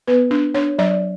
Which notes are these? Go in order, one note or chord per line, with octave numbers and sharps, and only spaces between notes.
B3 B4
D4
D4 C#5
F#3 D5